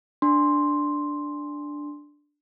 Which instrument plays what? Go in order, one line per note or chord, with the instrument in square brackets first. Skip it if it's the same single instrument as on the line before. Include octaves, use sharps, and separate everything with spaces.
[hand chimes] D4 C6